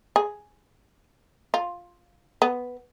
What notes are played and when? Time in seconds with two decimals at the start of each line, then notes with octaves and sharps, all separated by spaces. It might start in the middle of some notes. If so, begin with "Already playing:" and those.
0.16 G#4
1.54 F4
2.42 B3